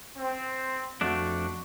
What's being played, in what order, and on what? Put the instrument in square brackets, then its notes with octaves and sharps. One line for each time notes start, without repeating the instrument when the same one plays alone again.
[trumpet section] C4
[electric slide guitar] F2 A3 D4 [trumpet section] F#4